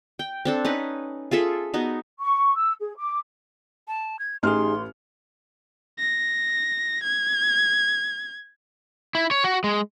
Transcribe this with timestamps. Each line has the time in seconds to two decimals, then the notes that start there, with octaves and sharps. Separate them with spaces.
0.19 G5
0.45 C4 D4 A4
0.65 C#4 D#4 B4
1.31 F4 G#4 A4 E5
1.74 B3 D#4 F#4
2.20 C#6
2.56 E6
2.79 G#4
2.97 D6
3.88 A5
4.19 G#6
4.43 A1 D#4 G4 G#4 C6 F6
5.99 A#6
7.04 G#6
9.15 E4
9.31 C#5
9.44 F#4
9.64 G#3